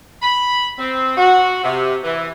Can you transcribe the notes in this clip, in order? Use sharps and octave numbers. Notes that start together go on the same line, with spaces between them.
B5
C4
F#4
C3
E3